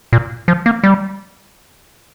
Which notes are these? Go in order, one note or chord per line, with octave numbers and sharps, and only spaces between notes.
A#2
F3
A#3
G3